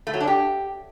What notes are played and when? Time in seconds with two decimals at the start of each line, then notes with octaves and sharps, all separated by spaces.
0.07 A3
0.14 F#3
0.20 D4
0.27 G4